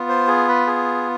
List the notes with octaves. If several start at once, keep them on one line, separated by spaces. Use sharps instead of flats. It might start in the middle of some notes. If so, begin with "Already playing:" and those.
Already playing: B3 F4
C5
G#4
B4
G#4